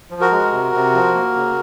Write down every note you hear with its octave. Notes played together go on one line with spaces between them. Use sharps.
F3
F#4 A#4
G#3
C3
C3
F3
A#3
C#3